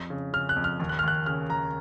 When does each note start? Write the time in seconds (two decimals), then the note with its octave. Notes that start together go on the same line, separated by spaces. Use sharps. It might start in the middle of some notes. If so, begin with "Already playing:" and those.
Already playing: F2
0.10 C#3
0.33 C#3 F6
0.49 F#6
0.56 F2
0.64 F6
0.80 D#2
0.89 F#6
0.99 F6
1.03 D#2 F#6
1.26 C#3 F6
1.49 D#2 A#5